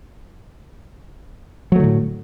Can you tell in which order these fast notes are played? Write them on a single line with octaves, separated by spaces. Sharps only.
F#3 A3 D3 A2